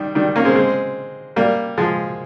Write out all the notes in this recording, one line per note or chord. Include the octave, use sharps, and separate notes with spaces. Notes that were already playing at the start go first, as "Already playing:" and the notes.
Already playing: D#3 G3
D#3 G3
A#3 C#4
G#3 C4
G#3 C4
G3 A#3
F3 G#3